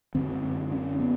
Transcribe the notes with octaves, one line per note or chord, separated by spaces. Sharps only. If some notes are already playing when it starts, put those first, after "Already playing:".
F#2 D3 C4
C#4
B3